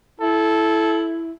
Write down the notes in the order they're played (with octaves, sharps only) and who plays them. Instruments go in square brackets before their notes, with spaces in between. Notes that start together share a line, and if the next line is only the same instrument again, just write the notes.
[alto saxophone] E4 [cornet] A4